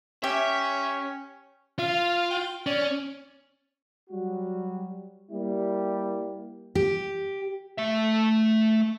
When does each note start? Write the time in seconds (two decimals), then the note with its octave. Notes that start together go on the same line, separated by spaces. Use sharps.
0.24 C#4 G4 E5
1.79 F4 F5
2.30 G5
2.66 C#4 D5
4.10 F#3 G3 F#4
5.32 G3 A#3 E4 G4
6.75 G4
7.78 A3 E5